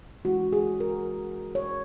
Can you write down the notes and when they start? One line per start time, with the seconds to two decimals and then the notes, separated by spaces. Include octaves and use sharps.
0.25 E3 G#3 C#4 E4 F#4
0.53 G#4
0.80 A#4
1.55 C#5